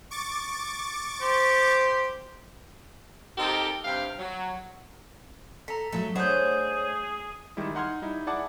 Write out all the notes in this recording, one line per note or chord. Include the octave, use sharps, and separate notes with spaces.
C#6 D6 A6
G4 C5
C4 D#4 G4 A4 A#4
G2 C3 F5 G5
F#3
A4 A#5 B6
F#3 G#3 A3 A4
A3 D4 G#4 C5 C#5 F#5 D#6 G6
D#3 G3 G#3 E4
D#4 F#5 C6 F6 G#6
G3 D#4 E4
E4 G#4 D5 F#5 A5 D6